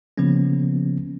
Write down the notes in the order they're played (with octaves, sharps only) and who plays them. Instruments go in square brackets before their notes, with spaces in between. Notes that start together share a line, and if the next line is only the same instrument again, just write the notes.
[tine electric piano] C#3 F3 A#3 B3 C#4